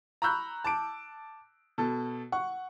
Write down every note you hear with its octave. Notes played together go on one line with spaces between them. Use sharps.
A#5 B5 C#6 E6 F#6 G6
A5 D6 D7
B2 A4
F#5 C#6